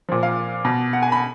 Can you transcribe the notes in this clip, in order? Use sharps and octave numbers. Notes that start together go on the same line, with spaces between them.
A#2 F3
F5
B2
F#5
G#5
B5